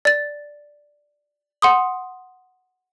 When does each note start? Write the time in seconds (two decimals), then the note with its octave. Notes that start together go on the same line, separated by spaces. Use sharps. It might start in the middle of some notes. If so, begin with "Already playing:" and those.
0.05 D5 A6
1.62 F#5 C6 D#6